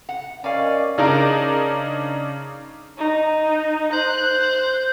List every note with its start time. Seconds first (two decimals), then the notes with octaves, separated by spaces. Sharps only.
0.09 F#5
0.44 C#4 A#4 D5 D#5 F5 G#5
0.98 C#3 D4 D#4 A#4
2.98 D#4
3.93 C5 F#6